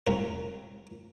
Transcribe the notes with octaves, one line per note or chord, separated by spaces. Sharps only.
C2 A#4